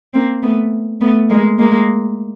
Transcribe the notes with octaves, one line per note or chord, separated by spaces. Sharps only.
A#3 C4
A3 B3
A3 B3
G#3 A#3
G#3 A#3